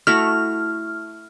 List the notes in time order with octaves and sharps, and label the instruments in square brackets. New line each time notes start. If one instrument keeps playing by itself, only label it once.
[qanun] A3 E4 F#4 [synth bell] F6